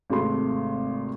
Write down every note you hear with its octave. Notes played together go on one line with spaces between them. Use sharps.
G#1 C3 G#3 A3 C6